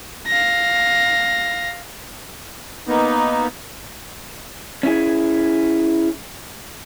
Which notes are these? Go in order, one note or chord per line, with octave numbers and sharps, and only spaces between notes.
F5 A#6
A#3 B3 D#4
C#4 E4 G#4